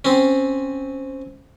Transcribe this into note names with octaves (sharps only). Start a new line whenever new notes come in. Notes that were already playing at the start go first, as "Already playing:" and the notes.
C4 C#4